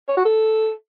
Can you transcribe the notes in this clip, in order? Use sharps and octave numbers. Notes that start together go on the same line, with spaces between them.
C#5
F#4
A4